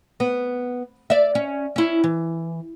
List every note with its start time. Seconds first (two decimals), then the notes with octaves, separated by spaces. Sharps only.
0.20 B3
1.10 D5 E5
1.35 C#4
1.76 C#4 E4
2.04 E3